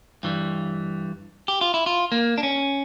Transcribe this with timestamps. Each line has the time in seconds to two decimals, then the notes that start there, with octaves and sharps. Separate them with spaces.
0.23 G2 E3 G3
1.48 G4
1.61 F4
1.74 E4
1.86 F4
2.12 A#3
2.38 D4
2.43 C#4